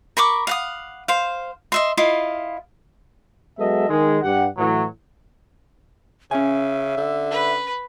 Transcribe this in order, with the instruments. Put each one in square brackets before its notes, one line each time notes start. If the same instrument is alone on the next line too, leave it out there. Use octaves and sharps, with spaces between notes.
[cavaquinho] A#4 B5 C#6 D6
F5 F#5 D#6
C5 F5
D#5 E5 C6
E4 F4 D#5 F5
[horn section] F#3 G#3 B3 A4 D#5 E5
D#3 G#3
G2 G4 F#5
A2 E3 F#3
[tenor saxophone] C#3 [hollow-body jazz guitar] C#4 G#5 [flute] E5
[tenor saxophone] D3
[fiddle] B4